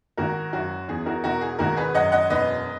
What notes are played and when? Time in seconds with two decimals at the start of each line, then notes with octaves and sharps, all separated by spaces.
0.17 G#1 F#4 A#4
0.53 F#2 F#4
0.88 E2 G#4
1.06 F#4 A#4
1.24 E1 F#4 A#4
1.41 G#4
1.59 G#1 F#4 A#4
1.76 G#4 B4
1.95 F#2 D#5 F#5
2.12 D#5 F#5
2.30 E1 B4 D#5